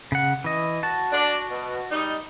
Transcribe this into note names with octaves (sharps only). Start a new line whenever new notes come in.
C#3 F#5
E3 D#5
F#4 A5
D4
B2
G3 D#4